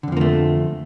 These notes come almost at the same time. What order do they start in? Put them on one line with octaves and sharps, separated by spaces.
D3 F2 F3 A#3 A3